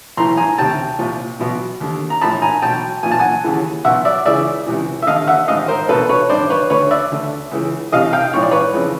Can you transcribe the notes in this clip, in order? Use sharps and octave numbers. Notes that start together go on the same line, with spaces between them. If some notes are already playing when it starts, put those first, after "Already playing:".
B1 A2 E3 A#5 C6
G#5 A#5
D2 C3 D#3 G5 A5
C2 A#2
B1 B2
D#2 D3
A#5
A#1 A2 E3 A5 B5
G#5 A#5
B1 B2 G5 A5
B1 A#2 G#5
A5
F#5 G#5
D#2 C#3 E3
B1 B2 E5 F#5
D5 E5
C#2 C#3 E3 D5 E5
C#2 C3 E3
E5
D#2 D3 D#5 F5
E5 F#5
A1 G#2 D#3 D#5 F5
A#4 C5
C2 B2 A4 B4
B4 C#5
A1 G2 D#3 C5 D5
B4 C#5
D2 D3 B4 C#5
D5 E5
D2 D3
C#2 C#3 E3
C2 C3 E3 D#5 F5
F5 G5
A#1 G#2 E3 C#5
D5
B4 C#5
F2 C#3 E3